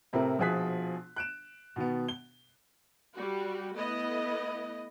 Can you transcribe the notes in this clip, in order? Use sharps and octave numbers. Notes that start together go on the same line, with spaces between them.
A2 C3 A3 C4 A#4
A#1 B2 F3 G#4 F#6 B6
F#6 D7 E7
B2 D#3 B3
G7
G3 F#4
A3 B3 E4 B4 D#5